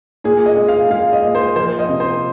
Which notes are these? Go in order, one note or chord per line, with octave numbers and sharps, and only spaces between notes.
A#2 G#4
D#5
G#3
F5
G#3 F5
D#5
A#2
C5
F3 C5
D#5
C3
C5